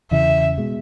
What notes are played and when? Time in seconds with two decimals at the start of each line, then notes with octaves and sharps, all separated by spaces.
0.11 E2 C#3 E3 E5
0.58 B2 G#3